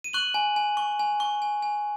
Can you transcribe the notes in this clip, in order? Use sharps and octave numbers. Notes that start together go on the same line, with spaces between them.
D#7
C#6 F#6 F#7
G#5
G#5
C#6
G#5
C#6
G#5
G#5